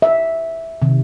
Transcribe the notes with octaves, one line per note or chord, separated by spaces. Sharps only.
E5
C3 D#3